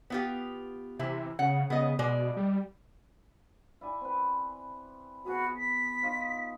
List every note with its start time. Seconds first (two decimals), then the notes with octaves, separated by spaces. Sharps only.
0.10 B3 F4 G4
0.99 C3 E3 E4
1.39 C#3 F#5
1.70 C#3 B3 D#5
1.99 B2 G#3 D5
2.37 G3
3.81 E4 D5 G#5
4.01 C4 B4
5.25 B3 F#4 G#4 B5
5.57 B6
6.02 D#4 F4 D#5